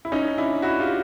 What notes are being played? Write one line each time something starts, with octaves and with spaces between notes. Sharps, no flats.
E4
C#4 D#4
D4 E4
E4 F#4
F4 G4